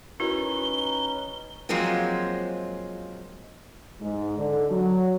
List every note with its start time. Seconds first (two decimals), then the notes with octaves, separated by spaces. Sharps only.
0.20 C#4 D#4 E4 F#4 A#4 B4 G7
1.69 F3 F#3 G#3 A#3 C4 F4
4.01 G#2
4.37 D3
4.70 F#3